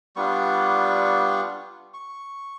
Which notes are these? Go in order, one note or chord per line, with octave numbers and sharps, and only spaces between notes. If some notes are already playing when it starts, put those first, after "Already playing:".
G3 B3 D4 F4 C#6
C#6